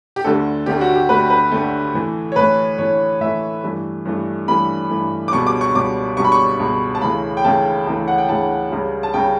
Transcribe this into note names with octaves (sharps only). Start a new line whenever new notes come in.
G4
D2 D3 A3 A4
D2 D3 A3 G4
F#4
G4
D2 D3 A3 B4
B4
D2 D3 A3
A2 E3 A3
C#5
A2 E3 A3 B4
A2 E3 A3 C#5
A2 E3 A3 E5
G2 E3 A3
G2 E3 A3
G2 E3 A3 B5
G2 E3 A3
D6
C#2 B2 G3 C#6
D6
C#6
C#2 B2 G3 D6
C#2 B2 G3 C#6
B5
C#6
C#2 B2 G3
A5
C#2 C#3 E3 A3 B5
G5
C#2 C#3 E3 A3 A5
C#2 C#3 E3 A3
F#5
G5
C#2 C#3 E3 A3 A5
C#2 C#3 G3
A5
C#2 C#3 G3 G5